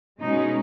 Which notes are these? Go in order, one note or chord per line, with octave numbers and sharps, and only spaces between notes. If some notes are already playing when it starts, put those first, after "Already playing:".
B2 G#3 C#4 D#4